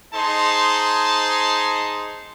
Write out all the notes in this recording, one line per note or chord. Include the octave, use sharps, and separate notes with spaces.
D#4 G#4 C5 A5 C6